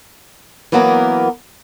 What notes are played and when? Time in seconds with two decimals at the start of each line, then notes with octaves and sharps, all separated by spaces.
0.72 E3 F#3 A#3 B3 A4 A#4